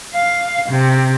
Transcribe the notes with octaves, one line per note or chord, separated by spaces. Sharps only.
F5
C3